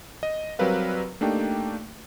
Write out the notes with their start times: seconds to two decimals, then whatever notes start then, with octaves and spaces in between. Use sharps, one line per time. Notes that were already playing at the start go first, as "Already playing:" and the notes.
0.23 D#5
0.59 F#3 G3 C4 A#4 B4 F5
1.21 A3 A#3 D4 D#4 G4 G5